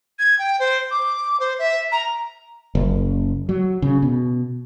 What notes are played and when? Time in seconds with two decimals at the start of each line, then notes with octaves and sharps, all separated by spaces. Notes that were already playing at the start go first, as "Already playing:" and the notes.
0.19 G#6
0.39 G5
0.60 C5
0.91 D6
1.40 C5
1.59 E5
1.92 A#5
2.75 F#1
3.49 F#3
3.82 C#3
4.02 B2